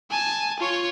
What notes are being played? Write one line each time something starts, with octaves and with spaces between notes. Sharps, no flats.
G#5 A5
F4 C#5